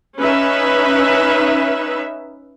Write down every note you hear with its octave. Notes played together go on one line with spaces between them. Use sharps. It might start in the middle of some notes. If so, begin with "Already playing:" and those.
C#4 D#4 B4 E5